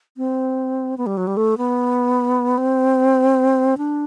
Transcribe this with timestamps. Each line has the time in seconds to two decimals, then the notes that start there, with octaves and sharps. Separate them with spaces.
0.17 C4
0.98 B3
1.06 G3
1.17 F#3
1.27 G3
1.37 A3
1.58 B3
2.58 C4
3.78 D4